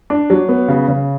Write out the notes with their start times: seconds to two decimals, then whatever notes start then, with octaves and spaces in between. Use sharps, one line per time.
0.10 D4
0.30 F#3
0.49 B3
0.68 C#3
0.88 C#3